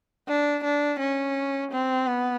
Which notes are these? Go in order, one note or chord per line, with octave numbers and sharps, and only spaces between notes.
D4
D4
C#4
C4
B3